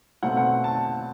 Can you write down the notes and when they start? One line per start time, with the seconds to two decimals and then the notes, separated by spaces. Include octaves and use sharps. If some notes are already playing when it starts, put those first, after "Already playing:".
0.23 B2 F#3 A3 C4 F#5
0.37 F#5
0.64 A5